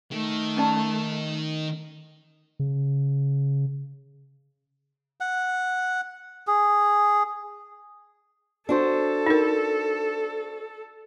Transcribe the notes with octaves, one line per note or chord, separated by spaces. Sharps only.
D#3 A3
C#4 D5 A5
C#3
F#5
G#4
D4 F#4 A4 C5
D#4 A#4